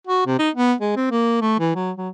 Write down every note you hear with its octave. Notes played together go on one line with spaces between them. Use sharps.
F#4
C3
D#4
B3
G#3
C4
A#3
A3
E3
F#3
F#3